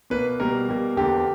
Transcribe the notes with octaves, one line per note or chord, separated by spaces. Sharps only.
B2 A#3 B4
B2 G3 A#3 A#4
B2 G3 A#3
E2 D3 A#3 G4